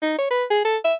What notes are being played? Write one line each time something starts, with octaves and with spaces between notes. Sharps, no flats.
D#4
C#5
B4
G#4
A4
E5